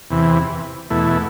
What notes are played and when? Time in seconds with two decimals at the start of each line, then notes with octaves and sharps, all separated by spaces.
0.10 E2 C3 E3
0.90 E2 B2 A3 E4